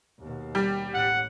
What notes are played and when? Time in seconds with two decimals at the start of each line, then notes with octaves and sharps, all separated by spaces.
0.19 D#2 B2
0.55 G3
0.94 A1 F#5